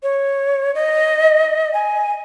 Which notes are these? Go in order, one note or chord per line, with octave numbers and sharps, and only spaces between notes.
C#5
D#5
G#5